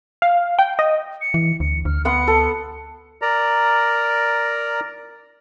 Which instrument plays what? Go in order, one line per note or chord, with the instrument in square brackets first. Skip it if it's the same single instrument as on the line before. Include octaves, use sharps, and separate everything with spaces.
[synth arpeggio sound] F5
G5
D#5
[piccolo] C#7
[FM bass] E3
[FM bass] D2 [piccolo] C#7
[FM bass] D2 [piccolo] F6
[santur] B3 F#5 C6 [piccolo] C#7
[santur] A4
[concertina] A#4 D5 A#5